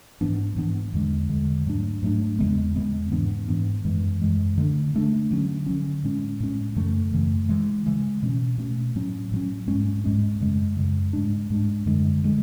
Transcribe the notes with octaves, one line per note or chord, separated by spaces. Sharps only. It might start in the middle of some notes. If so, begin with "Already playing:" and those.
G#2 E3 B3 D4
G#2 E3 B3 D4
E2 D3 G#3
E2 D3 G#3
G#2 F#3 A3 D4
G#2 F#3 A3 D4
E2 C#3 G#3 B3
E2 C#3 G#3 B3
G#2 E3 B3 D4
G#2 E3 B3 D4
F#2 E3 G#3
F#2 E3 G#3
D3 A3 D4
D3 A3 D4
D3 F#3 C#4
D3 F#3 C#4
A2 G#3 C#4
A2 G#3 C#4
F#2 C#3 E3 A3
F#2 C#3 E3 A3
C#3 E3 G#3
C#3 E3 G#3
B2 A3 C#4
B2 A3 C#4
A2 F#3 C#4
A2 F#3 C#4
G#2 G#3 C#4
G#2 G#3 C#4
F#2 C#3 G#3
F#2 C#3 G#3
G#2 G#3 D4
G#2 G#3 D4
F#2 D3 G#3
D3 G#3